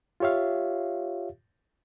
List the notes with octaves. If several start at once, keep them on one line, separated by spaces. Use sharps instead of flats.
F4 G4 C#5 E5 F5